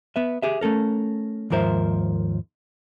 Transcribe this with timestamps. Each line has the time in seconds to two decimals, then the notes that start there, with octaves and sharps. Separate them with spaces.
0.16 B3 B4 E5
0.42 G4 G#4 E5
0.61 A3 C#4 A4 A#4
1.50 D#2 G#2 F3 A#4 C5 E5